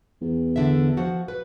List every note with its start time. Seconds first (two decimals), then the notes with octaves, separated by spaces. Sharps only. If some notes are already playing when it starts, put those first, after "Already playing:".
0.21 E2
0.56 D3 E5
0.97 F3 F#4 F#5
1.28 B4